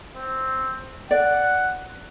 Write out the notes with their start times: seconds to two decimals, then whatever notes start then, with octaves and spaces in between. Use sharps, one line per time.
0.16 C4
1.11 D5 F#5